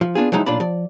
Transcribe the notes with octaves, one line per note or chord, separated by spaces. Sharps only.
F3
B3 D4 F4 G#4
F3 F#3 G#3 D#4 E4
B1 A#2 D4 F4 D5 B5
F3 D5